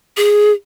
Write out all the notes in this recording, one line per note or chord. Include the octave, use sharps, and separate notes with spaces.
G#4